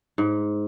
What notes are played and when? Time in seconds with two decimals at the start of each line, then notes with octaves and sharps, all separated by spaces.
0.18 G#2